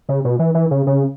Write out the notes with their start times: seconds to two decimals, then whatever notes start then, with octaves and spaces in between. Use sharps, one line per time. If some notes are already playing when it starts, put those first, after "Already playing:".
0.09 C#3
0.25 B2
0.39 E3
0.55 E3
0.71 C#3
0.87 C#3